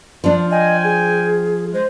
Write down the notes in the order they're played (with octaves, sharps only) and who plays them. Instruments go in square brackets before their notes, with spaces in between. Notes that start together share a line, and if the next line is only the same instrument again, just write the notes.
[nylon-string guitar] F3 D4
[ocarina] D#5 [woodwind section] G5 G#5
[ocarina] G#4
[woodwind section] G#3 [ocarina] C5